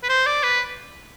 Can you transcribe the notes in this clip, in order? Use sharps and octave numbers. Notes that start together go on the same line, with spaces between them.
B4
C5
D5
B4